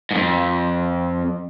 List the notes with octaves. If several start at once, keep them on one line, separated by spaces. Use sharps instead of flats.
F2 G#2